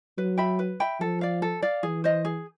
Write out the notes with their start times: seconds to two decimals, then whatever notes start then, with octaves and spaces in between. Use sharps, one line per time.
0.18 F#3 B4
0.38 E5 G5 B5
0.59 B4
0.80 E5 G5 B5
1.00 F3 A4
1.21 D5 F5
1.42 A4
1.62 D5 F5
1.83 E3 G#4
2.04 C5 D#5
2.25 G#4